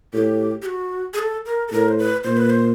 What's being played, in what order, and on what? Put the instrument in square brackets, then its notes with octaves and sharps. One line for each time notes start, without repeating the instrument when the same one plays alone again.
[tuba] A2 [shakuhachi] G4
[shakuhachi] G4
F#4
G#4
A4
A#4
A4
[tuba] A2 [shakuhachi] A#4
[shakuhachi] C5
B4
[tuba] A#2 [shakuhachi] C5
[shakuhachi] B4
C5